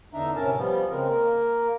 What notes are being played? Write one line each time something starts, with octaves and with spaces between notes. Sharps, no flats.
E2 D3 D4 D#4 E5 A#5
A2 C3 C#4 A#4 A5
F3 G3 B3
C#3 G#3 C4 A#4
A#3 A#4